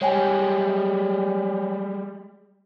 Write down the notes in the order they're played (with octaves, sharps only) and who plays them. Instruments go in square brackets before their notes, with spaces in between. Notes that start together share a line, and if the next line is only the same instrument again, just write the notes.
[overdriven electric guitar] G3 G#3 [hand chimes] C#5 G5 G#5